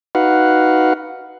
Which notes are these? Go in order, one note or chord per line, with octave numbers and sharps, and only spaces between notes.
D#4 F#4 B4 F5 F#5